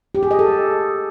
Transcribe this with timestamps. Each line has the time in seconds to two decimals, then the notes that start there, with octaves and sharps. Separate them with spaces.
0.15 G4
0.23 G#4
0.31 D#5
0.39 A4